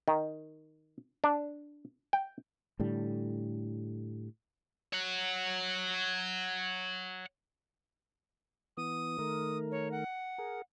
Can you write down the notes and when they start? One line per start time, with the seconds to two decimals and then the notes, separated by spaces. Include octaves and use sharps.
0.08 D#3
1.24 D4
2.13 G5
2.80 A2 D3 G3
4.93 C#5 F#5
8.77 E3 B3 D#6
9.19 D#3 A3 A#4
9.71 C#5
9.92 F#5
10.38 G#4 A#4